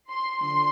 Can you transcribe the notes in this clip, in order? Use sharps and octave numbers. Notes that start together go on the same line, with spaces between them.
C6
D3 F3 C6